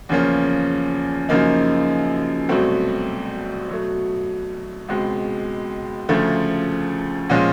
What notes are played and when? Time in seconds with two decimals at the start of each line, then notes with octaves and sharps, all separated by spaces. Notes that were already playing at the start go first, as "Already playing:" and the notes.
0.09 E2 C#3 F3 A#3 C#4
1.29 F#2 C#3 F3 A#3 D#4
2.49 C2 B2 F#3 A3 C4
3.69 B2 F#3 A3
4.88 C#2 B2 G#3 C4
6.09 D2 C#3 F3 A3
7.30 A#2 F3 G#3 C#4